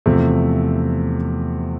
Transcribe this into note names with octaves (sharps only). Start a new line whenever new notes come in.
E2 C3 F3 A3